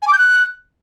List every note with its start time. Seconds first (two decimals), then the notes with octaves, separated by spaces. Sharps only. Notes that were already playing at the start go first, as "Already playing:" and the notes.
0.02 G#5
0.07 D6
0.13 G6
0.18 F#6